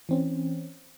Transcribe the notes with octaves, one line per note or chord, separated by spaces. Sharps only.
E3 C4 C#4